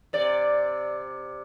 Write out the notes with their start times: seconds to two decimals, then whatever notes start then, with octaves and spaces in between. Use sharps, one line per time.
0.13 C3 D5